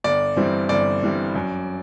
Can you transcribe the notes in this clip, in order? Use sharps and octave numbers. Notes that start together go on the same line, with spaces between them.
G1 D5
G2 E3 G3 C4
G1 D5
G2 E3 G3 C4
F#2